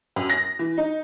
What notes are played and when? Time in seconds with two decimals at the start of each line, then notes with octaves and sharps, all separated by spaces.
0.16 F#2
0.30 A#6
0.59 E3
0.78 D#4